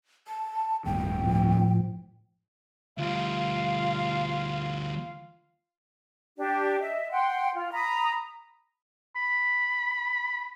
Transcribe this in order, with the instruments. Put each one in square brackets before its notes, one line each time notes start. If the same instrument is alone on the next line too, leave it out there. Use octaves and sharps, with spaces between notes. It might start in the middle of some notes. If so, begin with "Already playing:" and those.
[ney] A5
[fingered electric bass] D1 G2 D#3 [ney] G5
[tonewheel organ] A2 F3
[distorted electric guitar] D2 G3 [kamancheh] F4 F5
[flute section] D4 G4
D#5 E5
F#5 G5 C6
F4
A#5 B5 D#6
[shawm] B5